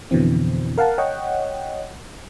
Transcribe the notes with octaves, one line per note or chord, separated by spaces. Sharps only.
F2 B2 D3 E3 C4
A#4 F5 F#5 A5
C#5 D#5 F#5 G5